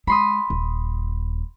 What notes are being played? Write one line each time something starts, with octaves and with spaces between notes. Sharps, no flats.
G#3 B5 C6 D#6
D#1